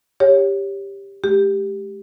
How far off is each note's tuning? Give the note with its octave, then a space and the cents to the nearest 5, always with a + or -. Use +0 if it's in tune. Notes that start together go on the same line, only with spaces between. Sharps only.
G4 +10 C#5 +0
G#3 +40 G4 +5